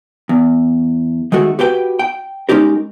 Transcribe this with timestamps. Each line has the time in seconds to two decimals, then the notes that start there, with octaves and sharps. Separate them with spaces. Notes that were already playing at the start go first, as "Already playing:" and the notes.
0.29 E2
1.32 D#3 G#3 A3 F#4
1.59 F#4 G4 B4 G5
1.99 G5
2.49 G#3 C#4 D#4 G4 A#4